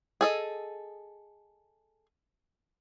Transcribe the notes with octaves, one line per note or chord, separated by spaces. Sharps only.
G#4 A4 D#5